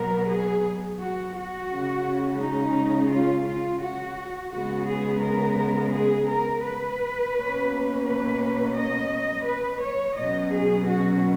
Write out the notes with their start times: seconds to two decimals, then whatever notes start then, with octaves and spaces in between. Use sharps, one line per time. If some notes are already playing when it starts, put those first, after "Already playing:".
Already playing: B2 F#3 B3 A#4
0.28 G#4
0.99 F#4
1.34 F#4
1.69 C#3 G#3 C#4
2.40 D#4
3.10 F4
3.46 F4
3.81 F#4
4.52 C#3 G#3 B3 F#4
4.87 G#4
5.22 A#4
5.93 G#4
6.29 A#4
6.64 B4
7.34 B2 A#3 C#4
8.05 B4
8.76 D#5
9.45 B4
9.81 C#5
10.17 B2 F#3 C#4 D#5
10.53 G#4
10.87 F#4